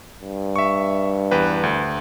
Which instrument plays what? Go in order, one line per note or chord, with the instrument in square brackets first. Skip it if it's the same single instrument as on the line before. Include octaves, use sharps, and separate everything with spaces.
[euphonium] G2
[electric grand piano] E5 C#6
E2 B4 G5
D2